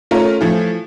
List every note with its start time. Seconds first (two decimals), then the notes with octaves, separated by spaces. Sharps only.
0.11 A3 C#4 F4 A#4
0.41 E3 F3 A3